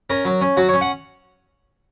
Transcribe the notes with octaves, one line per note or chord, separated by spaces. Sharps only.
C#4 A#4
F#3
C#4
F#3 F#4
C#5
C#4
F#5